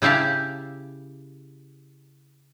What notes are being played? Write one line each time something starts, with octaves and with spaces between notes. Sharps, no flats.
C#3 E4 G4 F5 A5